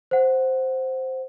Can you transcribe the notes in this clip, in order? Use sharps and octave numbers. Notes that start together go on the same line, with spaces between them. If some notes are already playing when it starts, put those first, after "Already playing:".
C5 F#5